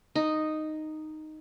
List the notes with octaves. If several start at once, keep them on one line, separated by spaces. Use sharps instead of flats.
D#4